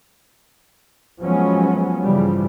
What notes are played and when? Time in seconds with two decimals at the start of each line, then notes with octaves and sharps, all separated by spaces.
1.21 F3 F#3 G#3 B3 C#4
2.03 G2 C#3 E3 F3 G3